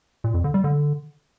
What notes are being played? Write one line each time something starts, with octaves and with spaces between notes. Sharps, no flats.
A#2
F2
D3
G3
D3